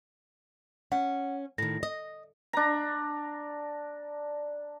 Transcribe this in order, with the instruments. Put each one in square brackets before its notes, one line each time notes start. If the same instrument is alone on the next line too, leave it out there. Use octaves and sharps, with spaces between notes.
[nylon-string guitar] C#4 [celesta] F#5
[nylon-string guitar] A2 D#3 [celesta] A#6
[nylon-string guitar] D#5
[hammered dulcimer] D4 A#5